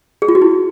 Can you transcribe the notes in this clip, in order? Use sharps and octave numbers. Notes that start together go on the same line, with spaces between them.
G#4
F4
F#4
E4